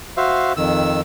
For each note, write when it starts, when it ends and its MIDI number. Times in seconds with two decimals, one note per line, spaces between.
0.17 0.53 66
0.17 0.53 72
0.17 0.53 76
0.17 0.53 77
0.57 1.01 41
0.57 1.01 51
0.57 1.01 88